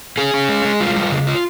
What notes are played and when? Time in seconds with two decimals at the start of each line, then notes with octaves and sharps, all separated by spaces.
0.17 C#4 G#4
0.34 C#4
0.49 G#3
0.65 G#3
0.80 G3 F4
0.96 G3
1.11 C#3
1.27 F4